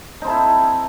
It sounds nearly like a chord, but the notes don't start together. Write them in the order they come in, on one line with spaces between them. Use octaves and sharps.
D#4 C4 A4 E4